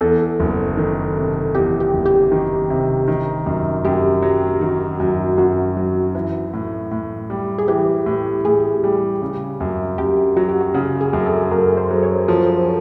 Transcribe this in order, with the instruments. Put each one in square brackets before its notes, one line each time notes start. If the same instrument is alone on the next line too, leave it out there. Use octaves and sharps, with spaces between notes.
[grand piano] E2 [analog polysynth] A4
[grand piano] F#1
D#3
C3
[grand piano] E2 [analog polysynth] G4
[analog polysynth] G4
[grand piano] F#1
[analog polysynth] G4
[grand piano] D#3
C3
D#3
F#2
[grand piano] F#2 [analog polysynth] G4
[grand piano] F#3
[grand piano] D#3 [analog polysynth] F#4
[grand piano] F#2
[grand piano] F#2 [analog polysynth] F#4
[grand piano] F#3
E3
A2
A2
G3
[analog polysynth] G#4
[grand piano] E3 [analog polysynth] G4
[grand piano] A2
[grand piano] A2 [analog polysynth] G#4
[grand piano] G3
C#3
F#2
[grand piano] F#2 [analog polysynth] G4
[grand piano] F#3 [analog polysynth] F#4
[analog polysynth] G4
F#4
[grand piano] C#3 [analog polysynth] F#4
[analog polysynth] G#4
[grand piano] F#2
[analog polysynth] A4
[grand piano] F#2 [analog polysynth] A#4
[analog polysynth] C5
[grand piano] F#3
[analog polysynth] C#5
[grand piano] F3